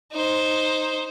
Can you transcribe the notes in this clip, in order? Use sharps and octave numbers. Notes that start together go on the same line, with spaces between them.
D#4 C5